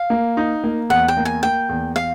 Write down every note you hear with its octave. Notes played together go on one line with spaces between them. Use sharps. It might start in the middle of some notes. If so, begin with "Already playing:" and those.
Already playing: F5
A#3
D#4
A#3
E2 F#5
G5
A#3
G#5
A#3 G5
E2
F5